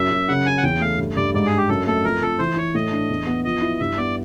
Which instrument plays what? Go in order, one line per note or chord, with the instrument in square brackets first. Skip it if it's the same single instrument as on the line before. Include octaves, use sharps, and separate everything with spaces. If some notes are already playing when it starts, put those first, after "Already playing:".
Already playing: [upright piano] F#2 [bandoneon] E5
[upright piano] F#2
[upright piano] C#3 [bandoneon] F#5
[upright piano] C#4 [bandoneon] G#5
[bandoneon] F#5
[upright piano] E2 [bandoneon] G5
[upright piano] A3 [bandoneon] F5
[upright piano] G2
[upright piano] G2 [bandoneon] D5
[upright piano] G#2 [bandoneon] D5
[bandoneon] G#4
[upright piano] D4
[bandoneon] G4
[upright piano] F#2 [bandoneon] A4
[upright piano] A3 [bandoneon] A4
[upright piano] F2 [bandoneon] A#4
[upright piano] F2 [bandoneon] A4
[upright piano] E3 [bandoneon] C5
[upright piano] E4 [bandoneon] C#5
[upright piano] A2 [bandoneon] D#5
[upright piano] D4
E2
B3
[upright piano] F3 [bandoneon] D#5
[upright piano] E4
[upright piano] G2 [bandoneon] E5
[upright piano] B3 [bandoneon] D5